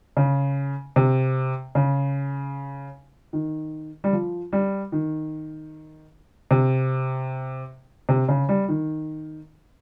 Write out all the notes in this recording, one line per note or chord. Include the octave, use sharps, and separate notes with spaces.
C#3
C3
C#3
D#3
G3
F3
G3
D#3
C3
C3
C#3
G3
D#3